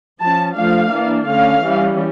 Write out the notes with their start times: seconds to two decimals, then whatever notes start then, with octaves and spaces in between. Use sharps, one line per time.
0.20 F3 C#4 A5
0.55 F3 A3 D4 F5
0.92 E3 A#3 D4
1.27 D3 A3 C#4 F5
1.63 E3 G3 C#4